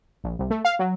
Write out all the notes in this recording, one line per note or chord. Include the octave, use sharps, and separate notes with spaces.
A#1
C2
A3
F5
F#3